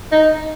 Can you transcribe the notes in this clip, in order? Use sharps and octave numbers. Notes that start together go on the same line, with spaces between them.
D#4